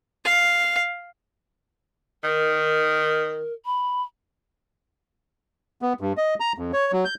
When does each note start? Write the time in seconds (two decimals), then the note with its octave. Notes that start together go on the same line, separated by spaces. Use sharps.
0.25 F5
2.24 D#3 A#4
3.66 B5
5.82 B3
6.01 G2
6.17 D#5
6.40 A#5
6.58 F2
6.73 C#5
6.93 F#3
7.05 G6